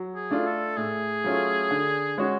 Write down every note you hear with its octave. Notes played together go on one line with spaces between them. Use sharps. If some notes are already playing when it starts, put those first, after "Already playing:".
Already playing: F#3
G#4
A3 D4 F4
A4
A2 G#4
F#3 A3 C#4 F4
D3
G#3 C#4 F#4